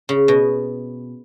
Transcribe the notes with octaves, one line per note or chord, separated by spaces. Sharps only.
C#3
B2